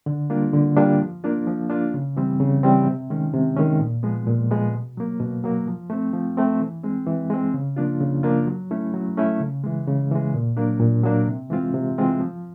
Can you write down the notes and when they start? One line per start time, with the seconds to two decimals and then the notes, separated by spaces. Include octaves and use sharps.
0.06 D3
0.30 G3 A#3 D4 F4
0.53 D3
0.76 G3 A#3 D4 F4
1.01 F3
1.24 A#3 D4 F4
1.47 F3
1.70 A#3 D4 F4
1.94 C#3
2.17 E3 G3 C4
2.40 C#3
2.63 E3 G3 C4
2.86 C3
3.10 D#3 G#3 C#4
3.34 C3
3.56 D#3 G#3 C#4
3.80 A#2
4.03 F3 G#3 B3
4.27 A#2
4.51 F3 G#3 B3
4.74 B2
4.97 F#3 A#3
5.20 B2
5.44 F#3 A#3
5.67 F3
5.90 A3 C4
6.13 F3
6.37 A3 C4
6.60 E3
6.84 G#3 C4
7.07 E3
7.30 G#3 C4
7.54 C#3
7.76 F3 A#3 D4 F4
8.00 C#3
8.23 F3 A#3 D4 F4
8.47 F#3
8.71 A3 C#4 E4
8.94 F#3
9.17 A3 C#4 E4
9.40 C#3
9.64 E3 G#3
9.87 C#3
10.11 E3 G#3
10.34 A#2
10.57 F#3 A#3 D4
10.80 A#2
11.04 F#3 A#3 D4
11.27 C3
11.50 E3 G#3 C4 F4
11.74 C3
11.98 E3 G#3 C4 F4
12.20 F3